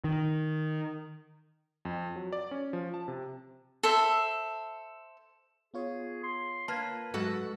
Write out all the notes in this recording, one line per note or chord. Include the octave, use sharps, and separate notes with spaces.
D#3
F2
F#3
D5
C#4
F3
A5
C3
A4 C5 E5
B3 F4 G#4 C#5
C6
A#3 B4 A5 F6 G#6
G#2 F#3 G#3 F#4 A4 F#5